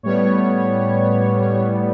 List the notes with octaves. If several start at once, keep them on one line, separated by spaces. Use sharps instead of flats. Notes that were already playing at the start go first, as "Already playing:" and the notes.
A2 G3 B3 C#5